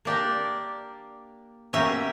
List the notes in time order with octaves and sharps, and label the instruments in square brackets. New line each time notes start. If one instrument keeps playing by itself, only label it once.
[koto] A#3 D4 G4 A#4 [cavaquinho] D5
[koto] B2 A#3 C#4 G4 A#4 [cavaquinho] E5